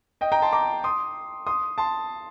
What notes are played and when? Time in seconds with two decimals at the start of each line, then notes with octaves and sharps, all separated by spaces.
0.21 D#5 G5
0.32 G5 A#5
0.42 A5 C6
0.52 A#5 D6
0.84 C6 D#6
1.47 C6 D#6
1.78 A5 C6